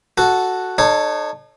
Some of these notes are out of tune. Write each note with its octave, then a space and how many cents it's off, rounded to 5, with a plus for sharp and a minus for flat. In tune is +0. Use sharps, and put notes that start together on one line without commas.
F#4 +0 A4 +0
D#4 -40 A4 +0 C#5 -5